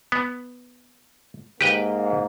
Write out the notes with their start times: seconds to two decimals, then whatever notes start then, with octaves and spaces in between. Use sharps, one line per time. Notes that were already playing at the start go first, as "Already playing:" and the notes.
0.12 B3
1.61 G#2 A#3 G4 B4 G5